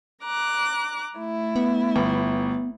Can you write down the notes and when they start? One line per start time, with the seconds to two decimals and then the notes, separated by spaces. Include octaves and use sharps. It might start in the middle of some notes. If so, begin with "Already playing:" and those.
0.23 A#5 D6 F#6
1.14 A3 E4
1.56 B3
1.96 G1 B3